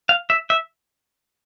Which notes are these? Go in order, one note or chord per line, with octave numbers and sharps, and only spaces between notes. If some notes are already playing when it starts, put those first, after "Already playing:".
F5
E5
E5